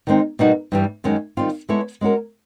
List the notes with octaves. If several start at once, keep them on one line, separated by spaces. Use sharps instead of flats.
D#3 G#3 C4 D#4
B2 G3 A#3 D#4 F#4
G2 E3 G3
F#2 D#3 G#3 C#4
D#3 G3 C4 F4
G#3 B3 E4 A4 C#5
G#3 C#4 F#4 A#4